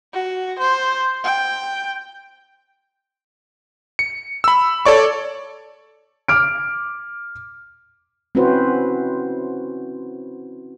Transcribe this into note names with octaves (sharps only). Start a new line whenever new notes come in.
F#4
C5
G5
C#7
B5 E6
A4 C#5 D5 C#6
D6 F6 D7
C4 C#4 E4 F#4 B4 C5